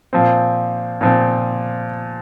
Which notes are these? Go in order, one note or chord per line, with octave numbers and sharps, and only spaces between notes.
A#2 F3 C4
A#2 F3 C4